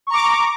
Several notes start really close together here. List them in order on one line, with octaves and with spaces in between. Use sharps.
C#6 A#5 D6